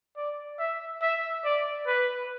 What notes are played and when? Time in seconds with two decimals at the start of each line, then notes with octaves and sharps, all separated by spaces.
0.17 D5
0.59 E5
1.02 E5
1.44 D5
1.87 B4